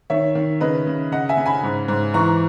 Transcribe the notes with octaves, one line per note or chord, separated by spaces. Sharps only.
D#3 C#5 E5
D#3
C#3 B4 D#5
C#3
C#3 D#5 F#5
E5 G#5
C#3
G#5 B5
G#2
G#2
E3 A#5 C#6